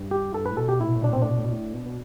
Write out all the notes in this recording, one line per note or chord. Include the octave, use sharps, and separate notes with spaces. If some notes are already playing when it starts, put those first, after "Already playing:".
Already playing: G2
G4
G2 A4
B4
A2
B2 A4
G4
A2 E4
B2
A2
B2 D4
A2
B2 C4
A2 D4
B2
A2
B2
A2
B2
B2